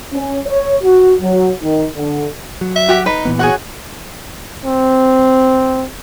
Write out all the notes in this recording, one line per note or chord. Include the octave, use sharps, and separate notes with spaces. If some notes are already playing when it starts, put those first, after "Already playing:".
C#4
C#5
F#4
F#3
D#3
D3
F#3
E5
F#4 G4
D#4 B4
A#2 E3 B3
F#4 G#4 C#5 F#5
C4